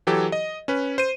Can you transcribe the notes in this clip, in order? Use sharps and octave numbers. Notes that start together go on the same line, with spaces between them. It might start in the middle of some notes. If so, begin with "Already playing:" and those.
E3 F#3 G4 A4
D#5
C#4 B4
C5 D#7